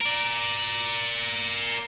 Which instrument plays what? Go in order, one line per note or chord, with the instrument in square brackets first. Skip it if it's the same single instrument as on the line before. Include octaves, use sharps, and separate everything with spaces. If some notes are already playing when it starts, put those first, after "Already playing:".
[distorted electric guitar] A#4 D5